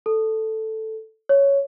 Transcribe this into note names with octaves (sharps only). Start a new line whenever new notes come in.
A4
C#5